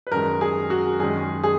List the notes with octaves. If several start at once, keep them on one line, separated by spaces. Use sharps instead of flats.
B4
F#2 D#3 G#3 A#4
G#4
F#4
F#2 D#3 G#3 G#4
G#4